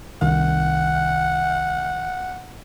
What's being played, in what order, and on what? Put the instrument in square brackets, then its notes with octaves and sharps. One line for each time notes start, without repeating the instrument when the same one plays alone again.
[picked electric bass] C2 D#3 [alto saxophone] F#5